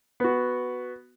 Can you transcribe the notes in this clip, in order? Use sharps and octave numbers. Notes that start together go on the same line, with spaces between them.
B3 F#4